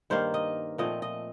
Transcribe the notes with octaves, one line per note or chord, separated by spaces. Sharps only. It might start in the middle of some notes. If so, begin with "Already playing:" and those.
G2 D#3 A#3 C5
D#5
A#2 F3 A3 C4 D#5
D#5